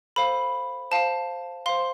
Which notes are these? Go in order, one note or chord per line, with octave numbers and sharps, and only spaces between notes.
A4 C5 F5 B5
C5 F5 A5
C5 F5 C6